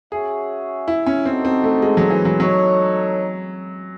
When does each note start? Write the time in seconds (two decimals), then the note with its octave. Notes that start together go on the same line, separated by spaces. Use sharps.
0.12 C#4 F#4 G#4 C#5 E5
0.88 E4
1.06 C#4
1.26 C4 D#4 F#4 A4
1.45 C4
1.64 A3
1.82 G#3
1.97 F#3
2.10 E3
2.25 F#3
2.40 F#3 D#4 A4 C#5